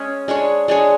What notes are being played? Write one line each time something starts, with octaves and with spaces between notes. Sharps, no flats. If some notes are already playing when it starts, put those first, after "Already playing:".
Already playing: G#3 C#4 G#4
G#3 D4 G#4 C#5
G#3 D4 G#4 C#5